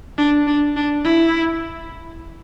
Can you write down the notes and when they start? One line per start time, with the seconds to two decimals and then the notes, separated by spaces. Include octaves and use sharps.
0.18 D4
0.48 D4
0.77 D4
1.04 E4